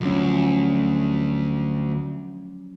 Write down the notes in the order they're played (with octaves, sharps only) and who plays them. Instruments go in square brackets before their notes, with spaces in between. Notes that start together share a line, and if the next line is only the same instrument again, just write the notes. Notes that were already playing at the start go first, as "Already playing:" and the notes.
[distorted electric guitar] D2 [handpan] F3 F#3 C#4